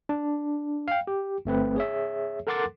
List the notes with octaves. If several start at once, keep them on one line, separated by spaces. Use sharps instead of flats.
D4
F5 G5
G4
G1 A3 C4 B4
G#4 C#5 E5
A4 A#4 F#5 C6 D6 A6